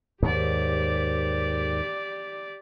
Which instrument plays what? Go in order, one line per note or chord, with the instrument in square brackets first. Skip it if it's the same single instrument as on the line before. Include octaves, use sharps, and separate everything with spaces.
[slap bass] D#2 G#2 [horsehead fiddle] G4 D5